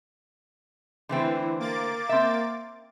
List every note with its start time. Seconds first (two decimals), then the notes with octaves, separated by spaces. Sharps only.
1.09 D3 E3 A3 C4
1.59 A#3 D6 A6
2.09 C4 E5